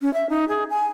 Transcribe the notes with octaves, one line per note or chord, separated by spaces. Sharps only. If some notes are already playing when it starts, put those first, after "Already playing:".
C#4
E5
D#4
G#4
G#5